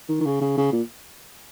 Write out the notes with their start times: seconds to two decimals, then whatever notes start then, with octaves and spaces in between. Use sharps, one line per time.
0.09 D#3
0.21 D#3
0.26 C#3
0.41 C#3
0.57 C#3
0.73 A#2